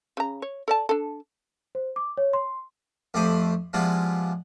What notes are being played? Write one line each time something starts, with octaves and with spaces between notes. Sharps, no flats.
C#3 A#5
C#5
A4 D5 A5
D4 A4
C5
D6
C#5
C6
F2 A3 G4 C5 B5 D#6
F3 G3 G#3 B3 E4 F4